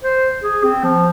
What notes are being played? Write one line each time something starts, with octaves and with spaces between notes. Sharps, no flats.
C5
G#4
C4
F3